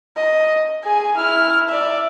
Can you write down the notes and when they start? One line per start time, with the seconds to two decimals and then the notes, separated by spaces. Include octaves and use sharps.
0.17 D#5
0.83 G#4 G#5
1.16 E4 F6
1.68 D5 E5